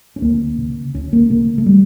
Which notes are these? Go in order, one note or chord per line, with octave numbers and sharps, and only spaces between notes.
C#4
D2 A#3
C#3
D2 C#4
A#3
C#3 A#3
A3
G3